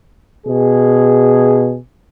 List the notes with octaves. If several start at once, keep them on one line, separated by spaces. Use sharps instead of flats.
B2 G#4